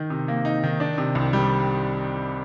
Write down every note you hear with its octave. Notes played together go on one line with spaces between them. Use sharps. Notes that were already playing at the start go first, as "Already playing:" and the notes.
Already playing: D#3 D#4
C3
A#3
D#4
D#3
D4
C3
C2
G3